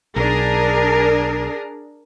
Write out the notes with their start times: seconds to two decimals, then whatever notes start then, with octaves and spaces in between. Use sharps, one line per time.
0.16 B1 D4 G#4 A#4